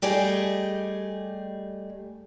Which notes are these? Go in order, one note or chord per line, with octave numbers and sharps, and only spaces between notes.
G3 A3 G4 G#4 D#5